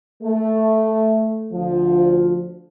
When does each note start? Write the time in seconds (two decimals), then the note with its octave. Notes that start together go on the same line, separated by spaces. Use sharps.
0.23 A3
1.53 D2 F3